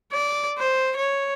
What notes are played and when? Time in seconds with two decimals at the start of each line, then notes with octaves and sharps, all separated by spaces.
0.13 D5
0.58 C5
0.97 C#5